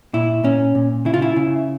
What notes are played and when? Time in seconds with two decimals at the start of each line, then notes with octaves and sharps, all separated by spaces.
0.13 A#2 E4
0.44 A#2 C#4
0.75 A#2
1.05 C#3 E4
1.14 F4
1.22 E4
1.36 C#3